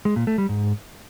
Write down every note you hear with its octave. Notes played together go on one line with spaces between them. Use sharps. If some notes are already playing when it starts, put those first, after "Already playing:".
G#3
A#2
A3
G3
G#2